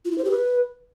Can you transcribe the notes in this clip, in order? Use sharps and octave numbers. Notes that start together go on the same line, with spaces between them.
F4
E4
C5
G4
B4